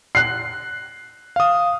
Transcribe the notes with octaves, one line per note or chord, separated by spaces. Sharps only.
F#6 C7
F5 D#6